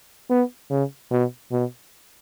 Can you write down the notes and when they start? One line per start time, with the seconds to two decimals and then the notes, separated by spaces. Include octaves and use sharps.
0.30 B3
0.70 C#3
1.11 B2
1.52 B2